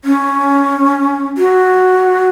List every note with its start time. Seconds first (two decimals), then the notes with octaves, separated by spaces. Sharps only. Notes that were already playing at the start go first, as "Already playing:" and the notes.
0.05 C#4
1.37 F#4